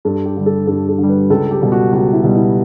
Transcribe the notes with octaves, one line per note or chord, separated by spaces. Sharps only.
G2 A4
G4
D3 G3
A4
G2 A4
A4
D3
G3
B4
C#2 A4
G4
B2 G3
F#4
C#2 F#4
E4
B2 G3
E4